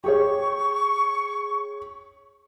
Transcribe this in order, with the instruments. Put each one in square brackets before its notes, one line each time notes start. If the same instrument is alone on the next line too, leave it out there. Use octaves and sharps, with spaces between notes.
[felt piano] G4 G#4 C#5 [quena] C#6